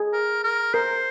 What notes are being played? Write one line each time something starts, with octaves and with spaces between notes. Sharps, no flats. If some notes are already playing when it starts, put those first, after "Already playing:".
Already playing: G#4
A#4
A#4
A#4 C5